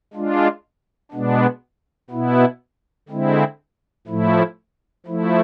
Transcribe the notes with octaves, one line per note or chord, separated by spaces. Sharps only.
G#3 D4 F4
B2 G#3 B3 D4
B2 B3 E4
D3 G#3 C4 E4
A2 F3 A3 E4
F3 A3 E4